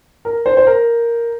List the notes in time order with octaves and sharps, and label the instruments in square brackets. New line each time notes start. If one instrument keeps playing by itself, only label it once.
[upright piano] A#4
C5
C5
A#4